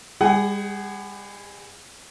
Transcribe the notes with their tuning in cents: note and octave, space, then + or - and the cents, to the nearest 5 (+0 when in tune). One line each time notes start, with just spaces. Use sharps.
G3 +40 G#4 +0 F#5 +30